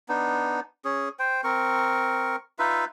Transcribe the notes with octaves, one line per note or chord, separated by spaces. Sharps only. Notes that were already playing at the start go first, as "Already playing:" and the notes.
B3 D4 D#4
C#4 G#4
C5 G5
C4 A#4 C#6
D#4 F4 B4 E5